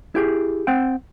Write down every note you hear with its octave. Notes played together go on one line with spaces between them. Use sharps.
E4 G4 G#4
C4 F#5 G5